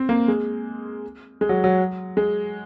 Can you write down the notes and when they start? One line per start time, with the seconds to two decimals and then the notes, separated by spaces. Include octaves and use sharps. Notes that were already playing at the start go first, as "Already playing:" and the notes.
Already playing: C4
0.09 A#3
0.28 G#3
1.41 G#3
1.49 F#3
1.64 F#3
2.17 G#3